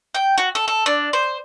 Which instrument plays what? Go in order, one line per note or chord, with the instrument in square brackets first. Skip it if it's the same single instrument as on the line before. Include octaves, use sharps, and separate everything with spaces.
[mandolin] G5
F#4
A4
A4
D4
C5